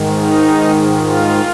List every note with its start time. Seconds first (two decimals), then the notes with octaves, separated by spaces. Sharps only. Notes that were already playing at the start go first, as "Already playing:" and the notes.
Already playing: G#2 D#3
0.12 D#4
0.97 F4